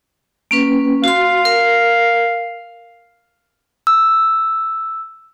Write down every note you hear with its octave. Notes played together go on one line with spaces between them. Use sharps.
A#3 C#4 B4
F#4 F5 C6
A#4
E6